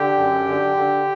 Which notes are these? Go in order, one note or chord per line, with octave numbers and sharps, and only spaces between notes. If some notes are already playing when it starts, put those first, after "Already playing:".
Already playing: D3 G4 G5
F#2
D3
D3